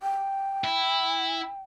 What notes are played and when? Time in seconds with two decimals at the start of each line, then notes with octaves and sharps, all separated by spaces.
0.02 G5
0.64 E4